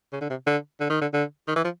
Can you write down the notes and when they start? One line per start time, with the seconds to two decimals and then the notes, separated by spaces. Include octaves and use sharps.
0.13 C#3
0.21 D3
0.30 C3
0.46 D3
0.80 D3
0.90 D#3
1.01 D3
1.13 D3
1.48 D#3
1.56 E3
1.64 F3